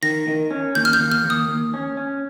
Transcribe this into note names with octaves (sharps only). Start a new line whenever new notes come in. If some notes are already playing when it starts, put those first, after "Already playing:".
D#3 A#6
D#3
C#4
D#2 G6
F6
G6
D#2
F6
D#2
D#6
D#2
C#4
C#4